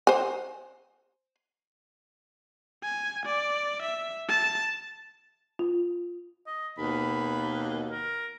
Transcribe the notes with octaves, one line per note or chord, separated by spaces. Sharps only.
C5 G#5
G#5
D5
E5
A5
F4
D#5
D#2 B2 B5
A#4